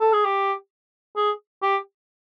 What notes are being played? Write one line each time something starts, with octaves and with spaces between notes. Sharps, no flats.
A4
G#4
G4
G#4
G4